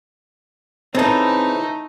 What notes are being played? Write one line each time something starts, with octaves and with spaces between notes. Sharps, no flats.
C#3 E3 A3 C4 D#4 A4